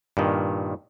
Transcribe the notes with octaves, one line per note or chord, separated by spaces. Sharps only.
G2 A#2 D#3